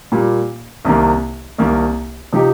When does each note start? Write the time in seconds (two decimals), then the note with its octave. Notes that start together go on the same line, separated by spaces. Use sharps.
0.12 A#2 G3 A#3
0.85 C2 C3 D#3 A#3
1.58 C2 C3 D#3 A#3
2.33 C3 F3 D#4 G4